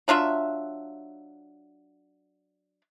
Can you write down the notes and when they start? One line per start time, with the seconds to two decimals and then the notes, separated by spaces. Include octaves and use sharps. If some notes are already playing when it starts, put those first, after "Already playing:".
0.08 F#3 D4 F4 E5